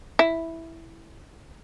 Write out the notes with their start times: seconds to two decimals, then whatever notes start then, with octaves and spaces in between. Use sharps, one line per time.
0.19 E4